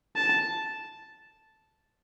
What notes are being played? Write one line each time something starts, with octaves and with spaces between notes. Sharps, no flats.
A5